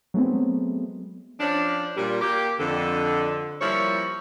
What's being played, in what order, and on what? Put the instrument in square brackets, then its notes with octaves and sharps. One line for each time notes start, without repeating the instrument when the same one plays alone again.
[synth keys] F#3 G#3 A3 B3 C4
[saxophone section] F3 C#4 D4
A#2 G3
A#3 G4
F2 D3
F3 G3 A#3 E4 C#5